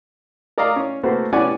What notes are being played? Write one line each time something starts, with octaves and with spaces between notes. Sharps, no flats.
A#4 D5 D#5 F5 A#5
C#4
A3 A#3 C4 F#4 B4 C5
B3 C#4 G4 D5 F#5 G#5